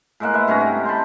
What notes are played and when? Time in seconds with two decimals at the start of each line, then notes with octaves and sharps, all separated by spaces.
0.20 A2 G#3 A#3 F#5
0.34 B4 E5
0.47 G2 C3 C#4 A#5
0.61 G#3
0.85 C5 G5 A5 B5